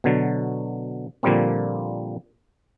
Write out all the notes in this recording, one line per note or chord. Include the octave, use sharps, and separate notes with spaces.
B2 D3 F#3
A#2 D3 F3 G3 A#3 C4